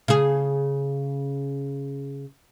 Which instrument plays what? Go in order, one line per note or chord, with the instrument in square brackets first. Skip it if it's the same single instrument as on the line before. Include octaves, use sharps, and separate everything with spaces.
[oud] C#3 G#4